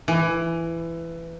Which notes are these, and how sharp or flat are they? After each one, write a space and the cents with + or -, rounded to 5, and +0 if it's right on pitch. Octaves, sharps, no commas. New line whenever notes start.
E3 +15